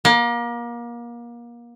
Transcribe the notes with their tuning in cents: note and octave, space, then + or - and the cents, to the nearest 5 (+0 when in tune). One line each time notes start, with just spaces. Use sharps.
A#3 +30